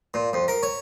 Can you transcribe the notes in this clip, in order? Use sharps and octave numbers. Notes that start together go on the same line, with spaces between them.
A#2
F2
A#4
C#5